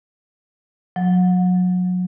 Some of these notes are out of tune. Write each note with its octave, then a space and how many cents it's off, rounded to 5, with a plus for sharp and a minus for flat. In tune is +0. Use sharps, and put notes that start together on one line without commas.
F#3 -30